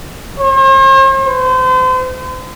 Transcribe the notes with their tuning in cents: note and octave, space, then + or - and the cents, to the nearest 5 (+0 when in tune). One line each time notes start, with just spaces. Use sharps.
C5 +45
C5 -35